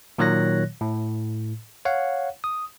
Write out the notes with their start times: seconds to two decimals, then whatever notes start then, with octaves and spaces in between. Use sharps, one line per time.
0.18 A#2 D#3 F#3 C#5 F#6 A#6
0.81 A2
1.85 C#5 F5 F#5
2.44 D#6